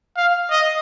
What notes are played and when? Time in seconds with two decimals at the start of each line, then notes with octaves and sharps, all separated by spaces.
0.17 F5
0.50 D#5